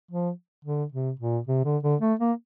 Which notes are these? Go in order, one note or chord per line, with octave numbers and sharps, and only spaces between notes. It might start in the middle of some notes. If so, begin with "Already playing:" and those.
F3
D3
C3
A#2
C3
D3
D3
A3
A#3